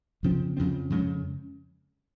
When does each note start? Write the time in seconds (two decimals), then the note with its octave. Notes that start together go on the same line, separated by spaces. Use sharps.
0.23 F2 C#3 F3 C4
0.57 F2 C#3 F3 C4
0.90 F2 C#3 G#3 C#4